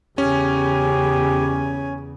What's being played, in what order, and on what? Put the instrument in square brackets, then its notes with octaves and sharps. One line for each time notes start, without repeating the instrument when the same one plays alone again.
[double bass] E2 C#3 [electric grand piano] C#4 [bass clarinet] G4 [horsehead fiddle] G#5